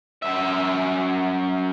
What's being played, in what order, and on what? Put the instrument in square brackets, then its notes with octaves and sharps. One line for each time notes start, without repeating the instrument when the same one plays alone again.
[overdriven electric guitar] F#2 E5